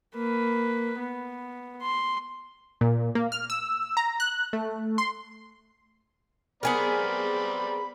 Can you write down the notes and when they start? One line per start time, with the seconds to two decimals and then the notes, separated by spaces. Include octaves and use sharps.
0.15 A#3 B4
1.00 B3
1.82 C6
2.81 A#2
3.15 A#3
3.32 F6
3.50 E6
3.97 A#5
4.20 F#6
4.53 A3
4.98 C6
6.63 B3 C4 G#4 A#4 D5 B5